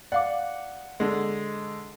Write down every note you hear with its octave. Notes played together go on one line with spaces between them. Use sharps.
D5 F5 F#5 D6
D3 G#3